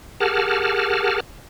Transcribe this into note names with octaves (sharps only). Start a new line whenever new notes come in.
G4 G#4 A#4 F#5 A5 F6